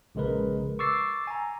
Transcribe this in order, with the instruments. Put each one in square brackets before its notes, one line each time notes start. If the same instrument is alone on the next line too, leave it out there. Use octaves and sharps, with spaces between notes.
[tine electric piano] A#1 C#3 G#3 A#4 B4
C#6 D6 E6 A6 C7
G#5 A#5